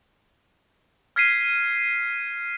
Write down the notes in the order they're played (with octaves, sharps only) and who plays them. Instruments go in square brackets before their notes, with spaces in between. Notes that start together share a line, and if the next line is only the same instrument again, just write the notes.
[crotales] F6 G#6 B6 C7 D#7